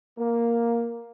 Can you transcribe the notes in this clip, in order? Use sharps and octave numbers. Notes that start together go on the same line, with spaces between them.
A#3